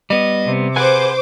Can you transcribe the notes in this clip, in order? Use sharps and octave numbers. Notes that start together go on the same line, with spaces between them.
G3 B3 D#5
C3
G#4 B4 C5 F#5 G#5 D6